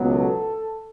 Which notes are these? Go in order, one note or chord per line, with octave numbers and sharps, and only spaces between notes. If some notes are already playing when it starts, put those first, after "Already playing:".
Already playing: C#2 B2 F#3 B3
A4